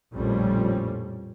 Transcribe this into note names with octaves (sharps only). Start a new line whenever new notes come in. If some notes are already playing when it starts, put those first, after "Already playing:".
A#1 F2 A2 G3 C4 C#4